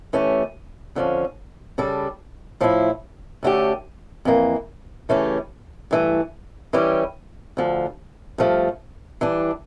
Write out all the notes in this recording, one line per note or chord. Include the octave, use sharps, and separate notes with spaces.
E3 A3 C#4 G4
F2 D3 F3 C#4
C#3 G3 D4 A4
A2 F3 A3 E4
D2 D3 A3 C#4 G4
F2 E3 A#3
C#3 E3 A3 C#4 G4
G2 E3 A3
E3 G3 C#4 G4
D2 D3 F3
G2 F3 A3
E3 G3 D4